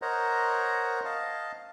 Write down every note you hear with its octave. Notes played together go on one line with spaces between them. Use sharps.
A#4 C5 C#5 D#5 F#5 A#5
D#5 F5 A5